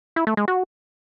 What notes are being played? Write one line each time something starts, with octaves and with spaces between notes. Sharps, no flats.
E4
A3
G#3
F#4